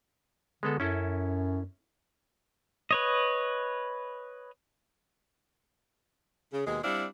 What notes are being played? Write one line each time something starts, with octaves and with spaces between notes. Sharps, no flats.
D3 G#3 B3 A4
F#2 C#4 E4 A4
B4 C#5 D#5
C#3
D#2 B2 G#3
G3 C4 D4 E4 F5